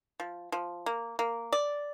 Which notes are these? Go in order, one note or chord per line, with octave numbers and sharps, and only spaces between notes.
F3
F3
A#3
A#3
D5